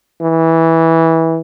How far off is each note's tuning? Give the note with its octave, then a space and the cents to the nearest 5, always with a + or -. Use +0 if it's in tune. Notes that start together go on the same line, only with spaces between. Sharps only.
E3 -15